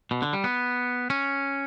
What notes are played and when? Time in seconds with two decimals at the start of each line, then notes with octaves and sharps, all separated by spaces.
0.11 B2
0.22 D3
0.33 G3
0.44 B3
1.10 C#4